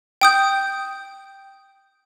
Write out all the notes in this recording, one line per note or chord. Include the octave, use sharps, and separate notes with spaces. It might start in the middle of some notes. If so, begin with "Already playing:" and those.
G5 D#6 G6